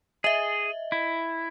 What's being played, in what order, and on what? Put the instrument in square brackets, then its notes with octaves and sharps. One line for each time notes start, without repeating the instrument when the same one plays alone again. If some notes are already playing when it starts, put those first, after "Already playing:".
[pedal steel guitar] G#4 [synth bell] D#5 E5
[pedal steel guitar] E4